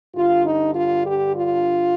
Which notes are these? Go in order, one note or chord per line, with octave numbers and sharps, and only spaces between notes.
G2 D3 F4
D#4
F4
G4
F4